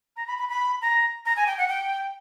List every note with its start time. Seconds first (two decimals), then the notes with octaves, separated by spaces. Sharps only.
0.16 A#5
0.27 B5
0.38 B5
0.49 B5
0.81 A#5
1.25 A#5
1.36 G#5
1.46 G5
1.58 F#5
1.68 G5